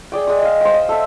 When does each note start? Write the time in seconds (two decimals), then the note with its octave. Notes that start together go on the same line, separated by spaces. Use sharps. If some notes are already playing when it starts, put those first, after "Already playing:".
0.12 G#4 D5 G5
0.27 G#3 G5 D#6
0.43 D#5 F5
0.61 C5 G5
0.74 D#5
0.89 A4 E5